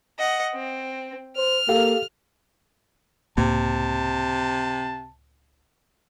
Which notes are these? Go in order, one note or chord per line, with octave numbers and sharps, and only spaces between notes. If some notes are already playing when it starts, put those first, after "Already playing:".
D#5 F#5
C4
C5 F6
A#3 G4 A4 F5
C#2 A2 C3 A#3 A5